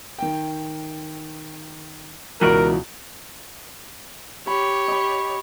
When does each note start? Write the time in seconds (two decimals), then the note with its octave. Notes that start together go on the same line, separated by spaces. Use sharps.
0.18 D#3 G5
2.41 C#2 B2 E3 F#4 A#4 D5
4.47 G4 C#5 B5
4.88 D#5 B5